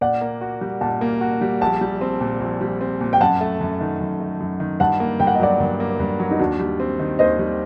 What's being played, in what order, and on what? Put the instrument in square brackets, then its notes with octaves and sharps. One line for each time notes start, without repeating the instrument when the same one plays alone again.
[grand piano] A#2 [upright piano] D5 F#5
[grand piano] A#3
F#4
G3
[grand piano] A#2 [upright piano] F#5 A5
[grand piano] A#3
F#4
G3
[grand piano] A#1 [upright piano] F#5 A5
[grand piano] G3
C4
A#2
A#1
G3
C4
A#2
[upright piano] G5
[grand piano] F#2 [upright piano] F#5 A5
[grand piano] A3
F#2
D#3
F#2
A3
F#2
D#3
[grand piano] G2 [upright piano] F#5 A5
[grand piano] A#3
[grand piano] G2 [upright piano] G5
[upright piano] F#5
D#5
[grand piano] F#3 [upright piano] D5 F#5
[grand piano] G2
A#3
G2
F#3
[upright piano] D#4
[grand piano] D#2 [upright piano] D4 F#4
[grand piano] G3
C4
D#3
[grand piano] D#2 [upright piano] C5 D#5
[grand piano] G3